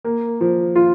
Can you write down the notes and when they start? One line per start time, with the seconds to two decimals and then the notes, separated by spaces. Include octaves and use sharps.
0.04 A#3
0.41 F3
0.76 F4